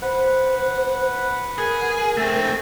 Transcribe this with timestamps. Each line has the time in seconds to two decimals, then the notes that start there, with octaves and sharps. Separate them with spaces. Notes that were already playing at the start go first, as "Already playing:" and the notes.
0.02 B4 C5 F#5
1.58 G#4 A#4
2.17 A3 C4